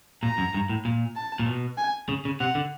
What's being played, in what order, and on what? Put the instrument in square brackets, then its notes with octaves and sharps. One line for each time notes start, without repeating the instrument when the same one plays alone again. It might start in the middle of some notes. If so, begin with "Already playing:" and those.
[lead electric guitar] A#2 [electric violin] A#5
[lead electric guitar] F#2
G2
A2
A#2
[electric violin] A5
[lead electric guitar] A#2
B2
[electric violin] G#5
[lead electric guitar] C#3
C#3
[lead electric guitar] C3 [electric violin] F#5
[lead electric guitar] D3